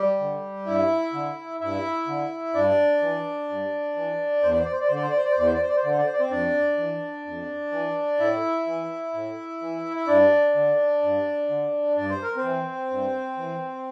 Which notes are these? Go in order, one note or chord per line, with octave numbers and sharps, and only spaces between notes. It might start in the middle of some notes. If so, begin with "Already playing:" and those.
Already playing: G3 G4
D3
G2 E4 E5
D3
G2 E4 E5
D3
G2 D4 D5
E3
G2
E3
E2 C5
D5
C5
D5
C5
D5
C5
D3
D5
C5
D5
C5
D5
C5
E2 D5
C5
D5
C5
D5
C5
D3 D5
C5
D5
C5
D5
C4 C5
F2 D4 D5
E3
F2
E3
A2 E4 E5
E3
A2
E3
E5
G2 D4 D5
D3
G2
D3
G2 D5
C5
A#4
C4 C5
E3
G2
E3